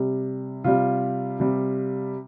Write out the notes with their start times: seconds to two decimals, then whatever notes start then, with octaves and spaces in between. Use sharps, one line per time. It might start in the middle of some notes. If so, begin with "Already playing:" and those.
Already playing: C3 G3
0.64 C3 G3 F4
1.40 C3 G3